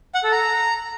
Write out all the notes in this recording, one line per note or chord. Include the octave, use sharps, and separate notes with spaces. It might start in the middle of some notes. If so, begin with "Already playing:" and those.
F#5
A4
A#5